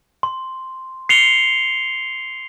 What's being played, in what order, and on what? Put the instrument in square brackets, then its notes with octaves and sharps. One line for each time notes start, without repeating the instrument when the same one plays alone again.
[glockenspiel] C6
C7 C#7 F7 G7